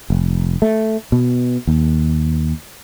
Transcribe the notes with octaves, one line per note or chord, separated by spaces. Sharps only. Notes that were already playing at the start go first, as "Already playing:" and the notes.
F1
A3
B2
D#2